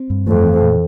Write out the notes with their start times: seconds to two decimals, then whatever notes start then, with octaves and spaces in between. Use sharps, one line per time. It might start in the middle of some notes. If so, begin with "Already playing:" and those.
Already playing: C4
0.10 G2
0.27 F2 A3
0.44 E3
0.62 A#2